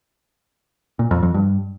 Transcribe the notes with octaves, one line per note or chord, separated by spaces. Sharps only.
A#2
F2
F2
G2